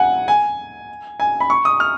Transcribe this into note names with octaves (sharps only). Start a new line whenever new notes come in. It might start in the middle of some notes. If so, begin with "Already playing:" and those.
Already playing: F#5 G#5
G#5
G#5
B5
C#6
D#6
F6